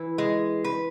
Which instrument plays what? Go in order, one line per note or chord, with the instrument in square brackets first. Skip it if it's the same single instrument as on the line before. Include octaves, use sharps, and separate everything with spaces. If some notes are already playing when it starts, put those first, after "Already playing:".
Already playing: [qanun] E3 E4
[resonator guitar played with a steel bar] G#3
B4